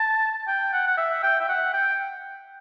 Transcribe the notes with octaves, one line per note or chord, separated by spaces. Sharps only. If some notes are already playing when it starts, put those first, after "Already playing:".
Already playing: A5
G5
F#5
F#5
E5
G5
E5
F#5
G5